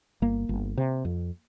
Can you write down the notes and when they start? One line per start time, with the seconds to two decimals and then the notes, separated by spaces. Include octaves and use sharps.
0.22 G1 A#3
0.49 G1
0.77 C3
1.05 F2